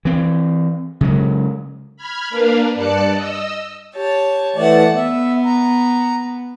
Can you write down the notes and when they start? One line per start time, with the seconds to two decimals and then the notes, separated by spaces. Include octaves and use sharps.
0.05 E3 C4
1.01 C#3 F#3 G#3
1.97 B5 F6 G#6
2.30 A#3 D4 A#4 B4 F5
2.75 G2 D5 A5 F#6 C#7
3.11 D#5 E6
3.94 G4 C#5 A5
4.56 E3 A3 D5 F#5 A5
4.96 B3 E5
5.46 A#5